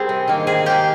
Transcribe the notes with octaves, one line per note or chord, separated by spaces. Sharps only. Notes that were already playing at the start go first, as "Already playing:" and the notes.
Already playing: G3 C4 G#4 A#4
C3
D#3 A#3
C3 G#4
D#3 A#3 G4